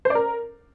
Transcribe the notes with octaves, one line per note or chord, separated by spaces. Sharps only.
C5
D5
A#4